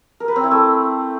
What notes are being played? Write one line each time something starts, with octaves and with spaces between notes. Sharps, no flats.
A#4
B4
C4
E4
A3